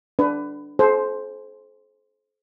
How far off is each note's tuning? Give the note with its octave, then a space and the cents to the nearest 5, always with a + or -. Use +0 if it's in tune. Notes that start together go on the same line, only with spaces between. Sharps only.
D4 -5 B4 +20
A4 -45 C5 +5